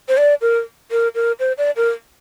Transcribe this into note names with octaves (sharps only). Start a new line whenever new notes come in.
C5
D5
A#4
A#4
A#4
C5
D5
A#4